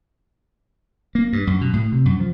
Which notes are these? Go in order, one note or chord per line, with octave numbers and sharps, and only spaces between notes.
A#3
G2
F#2
B2
A2
C3
F#2
F3